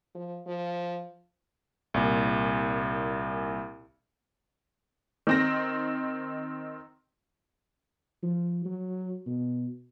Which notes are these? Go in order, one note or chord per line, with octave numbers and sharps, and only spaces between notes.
F3
F3
C2 A#2
D#3 C4 A#6
F3
F#3
B2